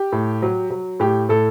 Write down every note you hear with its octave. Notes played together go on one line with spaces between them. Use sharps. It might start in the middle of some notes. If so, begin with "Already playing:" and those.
Already playing: G4
A2
F#3
F#3
A2 G4
A2 A4